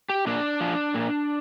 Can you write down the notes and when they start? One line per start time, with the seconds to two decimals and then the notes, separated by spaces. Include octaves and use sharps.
0.09 G4
0.27 A#2 D4
0.61 F3
0.94 A#2